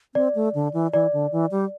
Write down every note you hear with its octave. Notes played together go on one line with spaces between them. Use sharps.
C4 D5
A3
D3
E3
E3 D5
D3
E3
G3